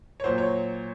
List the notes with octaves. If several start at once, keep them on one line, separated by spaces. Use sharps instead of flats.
C#5
A#2 F#3 C5
C#5